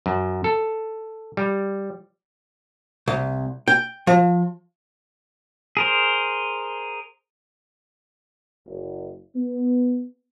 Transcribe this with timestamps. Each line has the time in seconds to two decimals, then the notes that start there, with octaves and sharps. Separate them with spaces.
0.06 F#2
0.44 A4
1.37 G3
3.08 C2
3.68 G5
4.07 F3
5.77 G#4 A#4 C5
8.66 F#1
9.36 B3